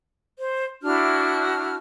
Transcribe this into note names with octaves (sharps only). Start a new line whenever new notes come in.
C5
D4 E4 F#4 F6